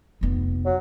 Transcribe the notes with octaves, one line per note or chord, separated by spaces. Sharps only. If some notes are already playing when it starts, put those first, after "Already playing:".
F1 B3
F#3